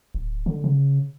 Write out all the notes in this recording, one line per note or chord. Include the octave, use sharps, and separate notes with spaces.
D1
D3
C#3